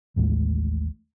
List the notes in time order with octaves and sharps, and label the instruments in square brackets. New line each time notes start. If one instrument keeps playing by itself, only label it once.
[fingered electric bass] A1 D#2 A2 G#3